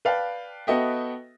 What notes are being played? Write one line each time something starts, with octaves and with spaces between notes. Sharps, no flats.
B4 D5 F5 G5 A5
B3 F#4 A4 D#5 E5 G5